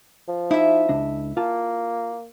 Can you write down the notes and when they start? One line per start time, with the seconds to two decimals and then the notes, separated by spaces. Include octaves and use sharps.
0.28 F3
0.51 D#4 E4 E5
0.89 C#2 D4 D#5
1.37 A#3 F4 A5